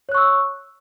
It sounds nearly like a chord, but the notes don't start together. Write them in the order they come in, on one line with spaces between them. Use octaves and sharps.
C#5 F#6 C#6 E6